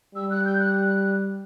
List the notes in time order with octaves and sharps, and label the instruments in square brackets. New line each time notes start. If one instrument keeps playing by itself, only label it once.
[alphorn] G3 [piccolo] E6
[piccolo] F#6
G6
F#6